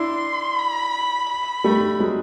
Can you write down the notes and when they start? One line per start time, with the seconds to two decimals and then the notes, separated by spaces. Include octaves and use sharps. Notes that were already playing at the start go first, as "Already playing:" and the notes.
Already playing: D4 E4 C6
0.59 B5
1.29 B5
1.64 G3 A3
1.99 F#3 G#3